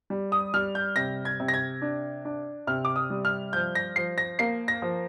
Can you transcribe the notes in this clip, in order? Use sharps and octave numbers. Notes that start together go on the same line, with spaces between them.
G3
D#6
G3 F6
G6
C3 A#6
G#6
C3
A#6
G#6
D4
D4
C3 F6
D6
D#6
G3
F6
F3 G6
A#6
F3 C7
A#6
A#3 C7
A#6
F3